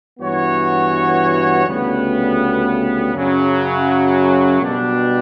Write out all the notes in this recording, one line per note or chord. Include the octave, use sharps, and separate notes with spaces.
G2 E3 B3 F#4 C#5
D2 C#3 G3 B3
F#2 C#3 F#3
B2 G3 D4